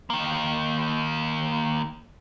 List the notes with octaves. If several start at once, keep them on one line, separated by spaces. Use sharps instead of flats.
D#3 A#3